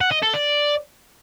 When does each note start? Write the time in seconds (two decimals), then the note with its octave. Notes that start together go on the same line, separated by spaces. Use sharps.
0.01 F#5
0.12 D#5
0.23 A4
0.34 D5